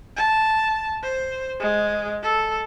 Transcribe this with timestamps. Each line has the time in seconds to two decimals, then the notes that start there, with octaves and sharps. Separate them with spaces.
0.16 A5
1.03 C5
1.60 G#3
2.23 A4